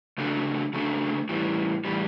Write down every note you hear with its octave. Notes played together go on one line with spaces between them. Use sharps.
C#3 F#3 A3 D4 A4
C#3 F#3 A3 D4 A4
A2 E3 G3
A2 E3 G3